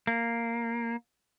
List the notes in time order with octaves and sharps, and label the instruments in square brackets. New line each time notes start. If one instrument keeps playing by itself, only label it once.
[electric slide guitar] A#3